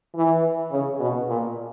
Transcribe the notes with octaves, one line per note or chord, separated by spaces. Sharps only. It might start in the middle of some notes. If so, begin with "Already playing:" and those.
E3
C#3
B2
A#2